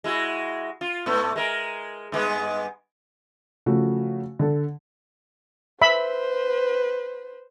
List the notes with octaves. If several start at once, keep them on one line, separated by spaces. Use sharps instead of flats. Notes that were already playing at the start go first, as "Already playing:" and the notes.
G#3 E4 F#4
F4
G#2 A3 B3
G#3 A#4
G2 G#3 B3
C#3 F3 A3 F#4
D3 A4
B4 C5 E5 B5